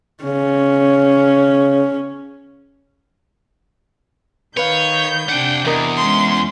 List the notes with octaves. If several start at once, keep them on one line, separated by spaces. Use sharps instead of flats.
C#3 C#4
D#3 B4 C#5 F5 G6
C3 D4 F#5 G5
E2 E4 A#4 D#5
G#3 C#4 C6